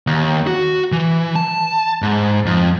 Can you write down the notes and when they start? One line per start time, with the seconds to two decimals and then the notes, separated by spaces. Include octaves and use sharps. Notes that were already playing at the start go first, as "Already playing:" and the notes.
0.07 D#2
0.47 F#4
0.92 E3
1.35 A5
2.02 G#2
2.46 F2